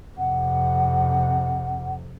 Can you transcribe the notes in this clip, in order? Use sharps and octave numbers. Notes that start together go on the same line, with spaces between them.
F2 C3 F#5